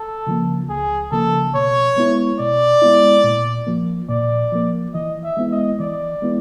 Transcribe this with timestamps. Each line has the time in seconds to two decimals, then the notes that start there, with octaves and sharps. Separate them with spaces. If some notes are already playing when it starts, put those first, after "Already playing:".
Already playing: A4
0.27 C#3 F3 A#3
0.69 C#2 G#4
1.12 C#3 F3 A#3 A4
1.54 B2 C#5
1.96 G#3 B3 E4
2.39 B2 D5
2.82 G#3 B3 E4
3.24 A#2
3.67 F3 A#3
4.09 A#2 D5
4.52 F3 A#3
4.94 E3 D#5
5.24 E5
5.37 G#3 B3 E4
5.52 D#5
5.80 E3 D5
6.22 G#3 B3 E4